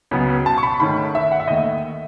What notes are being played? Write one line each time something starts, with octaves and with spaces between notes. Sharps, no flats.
C#2 C#3 F#3 B3
A5
C#6
B5
G#2 D#3 A3 C#4 B5
E5
F#5
E5
D#2 D#3 A3 D#5
E5